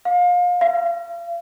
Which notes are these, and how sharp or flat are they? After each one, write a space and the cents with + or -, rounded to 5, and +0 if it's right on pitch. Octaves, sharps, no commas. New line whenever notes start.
F5 +30
F5 -35